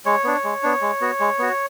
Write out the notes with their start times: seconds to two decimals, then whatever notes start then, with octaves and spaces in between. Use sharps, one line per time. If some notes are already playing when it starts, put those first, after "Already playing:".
0.06 G#3 C#5
0.24 B3 D4
0.44 G#3
0.63 B3 D4
0.82 G#3
1.01 B3 F#4
1.20 G#3
1.39 B3 F#4